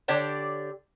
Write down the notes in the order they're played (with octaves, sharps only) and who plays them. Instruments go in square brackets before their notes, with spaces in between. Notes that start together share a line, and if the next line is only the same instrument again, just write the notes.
[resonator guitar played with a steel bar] D3 G4 C#5 D5 G5 A5